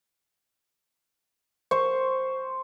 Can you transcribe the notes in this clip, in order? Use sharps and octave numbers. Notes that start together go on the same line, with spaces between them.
C5 C#6